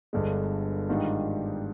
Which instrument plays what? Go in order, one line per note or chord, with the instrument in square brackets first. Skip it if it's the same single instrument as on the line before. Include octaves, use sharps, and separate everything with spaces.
[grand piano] G1 G2 D3 G#3
G#2 D#3 G3 D4 F4